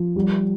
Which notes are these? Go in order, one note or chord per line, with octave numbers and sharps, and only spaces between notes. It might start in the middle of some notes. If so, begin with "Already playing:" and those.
Already playing: F3
G3